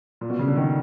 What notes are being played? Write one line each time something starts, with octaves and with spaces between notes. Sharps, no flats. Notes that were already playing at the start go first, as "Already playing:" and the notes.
A#2
B2
C#3
D3
D#3